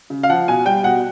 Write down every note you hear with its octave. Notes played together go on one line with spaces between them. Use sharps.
C#3
F5
F3 F#5
B2 G#5
G3 G5
B2 F#5